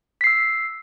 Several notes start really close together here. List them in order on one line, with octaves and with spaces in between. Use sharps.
B6 C7 E6